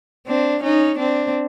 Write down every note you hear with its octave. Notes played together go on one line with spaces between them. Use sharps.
C4 D4
C#4 D#4
C4 D4